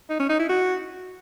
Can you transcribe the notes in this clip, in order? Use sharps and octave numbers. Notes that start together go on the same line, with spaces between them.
D#4
C#4
D#4
E4
F#4